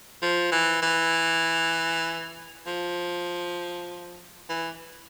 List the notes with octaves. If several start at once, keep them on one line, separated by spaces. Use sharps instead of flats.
F3
E3
E3
F3
E3